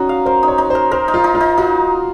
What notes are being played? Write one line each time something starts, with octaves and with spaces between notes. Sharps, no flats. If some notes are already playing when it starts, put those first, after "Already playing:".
Already playing: C#4 D#4 F#4
F5
A#4 C5
D#4
C#5
D#4
A#4 C5
A#4 C5
D#4
F4
D#4
F4
D#4
D#4 F#4